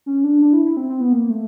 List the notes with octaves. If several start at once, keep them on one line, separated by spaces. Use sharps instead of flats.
C#4
D4
D4
E4
E4
C4
C4
B3
A#3
A3